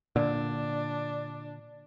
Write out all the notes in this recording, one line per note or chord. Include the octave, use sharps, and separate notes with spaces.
A#2 D3 D4